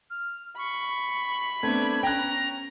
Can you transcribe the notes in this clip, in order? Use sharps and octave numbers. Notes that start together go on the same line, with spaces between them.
F6
B5 C#6
A3 B3 C4 D4 G#6
C#4 G5 A#5 F#6